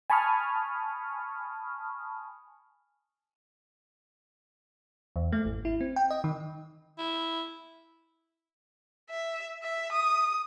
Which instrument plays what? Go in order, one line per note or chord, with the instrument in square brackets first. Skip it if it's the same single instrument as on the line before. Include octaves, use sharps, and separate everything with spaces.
[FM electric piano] G#5 A5 B5 C#6 D#6 F6
E2
A3
G#1
E4
C4
G5
D#5
D#3
[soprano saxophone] E4
[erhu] E5
E5
D#6